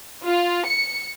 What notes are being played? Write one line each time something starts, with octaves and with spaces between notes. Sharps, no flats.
F4
C#7